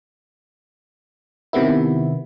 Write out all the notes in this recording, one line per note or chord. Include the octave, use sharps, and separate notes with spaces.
C3 D#3 B3 E4